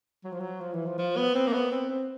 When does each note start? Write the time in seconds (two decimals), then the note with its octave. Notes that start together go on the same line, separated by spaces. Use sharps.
0.24 F#3
0.32 F3
0.40 F#3
0.61 F3
0.73 E3
0.86 F3
0.98 F3
1.17 B3
1.35 C4
1.47 A#3
1.53 B3
1.72 C4
1.89 C4